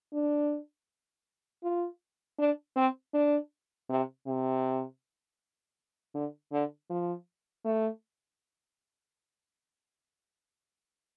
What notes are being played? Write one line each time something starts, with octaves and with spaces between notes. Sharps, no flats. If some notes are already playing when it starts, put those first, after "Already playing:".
D4
F4
D4
C4
D4
C3
C3
D3
D3
F3
A3